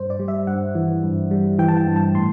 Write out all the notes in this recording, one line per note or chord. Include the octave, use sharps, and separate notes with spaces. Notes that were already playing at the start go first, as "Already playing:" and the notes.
Already playing: G2 C5
D5
G3
E5
G2 F#5
E3
G2
G3
E3 G5
A5
G5
G2
A5
A2 C6